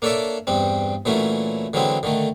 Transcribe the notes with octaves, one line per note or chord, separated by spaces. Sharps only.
A#3 D4 A4 C#5 D5 E5
E2 G2 G3 C4
A#2 E3 F#3 A3 C#4 E4
D3 E3 F#3 G#3 C4 E4
D3 D#3 A3